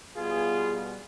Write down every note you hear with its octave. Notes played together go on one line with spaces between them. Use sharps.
B2 G3 B3 F4 G#4